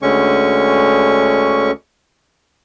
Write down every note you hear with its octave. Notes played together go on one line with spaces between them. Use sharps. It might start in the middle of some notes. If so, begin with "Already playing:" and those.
D2 D3 G#3 C#4 C#6